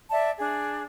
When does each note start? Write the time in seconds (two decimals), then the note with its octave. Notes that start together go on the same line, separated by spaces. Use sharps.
0.11 D5 E5 A5
0.38 D4 G#4